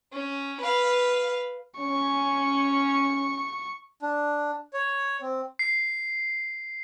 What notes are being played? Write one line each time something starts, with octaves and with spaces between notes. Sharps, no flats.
C#4
B4 F5
C#4 C#6
D4
C#5
C4
C7